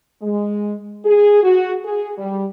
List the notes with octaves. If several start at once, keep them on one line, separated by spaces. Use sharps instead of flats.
G#3
G#4
F#4
G#4
G3